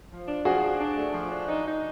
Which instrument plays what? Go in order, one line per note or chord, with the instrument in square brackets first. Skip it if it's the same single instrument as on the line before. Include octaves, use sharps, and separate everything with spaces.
[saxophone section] F3
D4
[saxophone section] F3 [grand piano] F#4 G#4
[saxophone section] D4
D4
A3
F3
D4
D#4
D#4